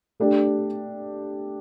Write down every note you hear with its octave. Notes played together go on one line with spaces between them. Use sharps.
A3 D4 G4